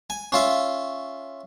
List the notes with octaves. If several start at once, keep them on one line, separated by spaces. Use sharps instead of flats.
G#5
C#4 F4 E5